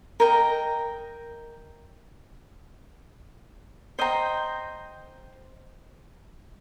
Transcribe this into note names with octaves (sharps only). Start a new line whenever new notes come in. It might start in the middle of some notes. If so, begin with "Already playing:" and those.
A#4 D#5 G5 A#5
C5 D#5 G5 A#5